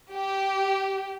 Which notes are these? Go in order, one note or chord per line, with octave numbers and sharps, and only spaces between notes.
G4